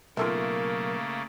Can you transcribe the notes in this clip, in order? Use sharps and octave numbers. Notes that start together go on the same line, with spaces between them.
B1 C#3 A3 A#3 F4 A4 A#4 E5